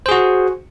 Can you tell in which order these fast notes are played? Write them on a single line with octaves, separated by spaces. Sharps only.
C5 G#4 F#4